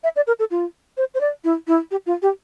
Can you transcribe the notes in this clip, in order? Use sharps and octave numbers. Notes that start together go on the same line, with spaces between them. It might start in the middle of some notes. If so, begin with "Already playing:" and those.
E5
D5
A#4
A4
F4
C5
C5
D5
E4
E4
G4
F4
G4